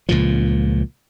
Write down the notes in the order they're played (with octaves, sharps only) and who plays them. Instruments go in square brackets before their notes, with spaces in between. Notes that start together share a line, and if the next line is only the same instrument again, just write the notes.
[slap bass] C#2 A#2 F3